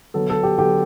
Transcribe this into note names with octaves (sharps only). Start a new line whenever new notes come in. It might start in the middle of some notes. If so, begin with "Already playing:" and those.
D3 F#3 B3 A4
A4
G4
D3 F#3 B3 G4